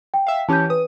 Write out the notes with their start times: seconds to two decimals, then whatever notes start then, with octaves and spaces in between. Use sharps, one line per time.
0.14 G5
0.27 E5 F5
0.49 E3 C#4 G4 A5 G6
0.70 B4 D#6